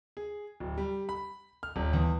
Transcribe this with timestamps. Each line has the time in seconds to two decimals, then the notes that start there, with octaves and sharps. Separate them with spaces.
0.17 G#4
0.60 D1
0.78 G3
1.09 B5
1.63 F6
1.76 D#1
1.93 E2